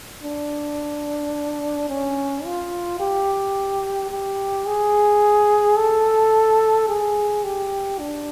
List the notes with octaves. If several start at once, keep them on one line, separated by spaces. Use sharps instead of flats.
D4
C#4
F4
G4
G4
G#4
A4
G#4
G4
D4